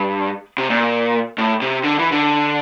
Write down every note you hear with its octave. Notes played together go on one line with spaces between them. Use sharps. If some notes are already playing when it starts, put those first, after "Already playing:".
Already playing: G2
C3
A#2
A2
C3
D3
E3
D3